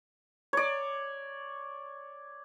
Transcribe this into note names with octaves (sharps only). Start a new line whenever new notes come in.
C#5 D5